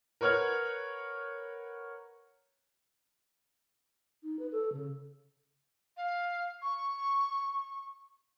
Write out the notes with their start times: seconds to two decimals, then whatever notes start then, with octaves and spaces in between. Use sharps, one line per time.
0.21 A#4 B4 C#5 F#5 F6 G#6
4.23 D#4
4.39 B4
4.52 A4
4.73 C#3
5.97 F5
6.62 C#6